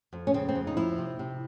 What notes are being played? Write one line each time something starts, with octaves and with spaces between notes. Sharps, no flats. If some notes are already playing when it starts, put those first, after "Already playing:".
F2
C#4
C#3 C4
C4
F2
D#4
F3 E4
C3
C3